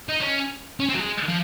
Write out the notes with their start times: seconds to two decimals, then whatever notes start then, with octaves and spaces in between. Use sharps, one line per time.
0.09 D#4
0.21 C#4
0.80 C#4
0.89 C4
0.94 F#3
0.99 G#3
1.28 F3